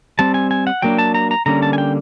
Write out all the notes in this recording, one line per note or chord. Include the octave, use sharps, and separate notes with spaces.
G3 C4 A5
G#5
G#5
F#5
F#3 A#3 D4 G5
A5
A#5
A#5
D3 G3 A#3 C#4 A#5
A5
G#5
G5